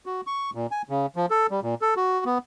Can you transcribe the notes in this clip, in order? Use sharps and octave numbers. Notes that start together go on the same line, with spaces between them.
F#4
C#6
A#2
G#5
C#3
F3
A4
G3
A#2
A4
F#4
B3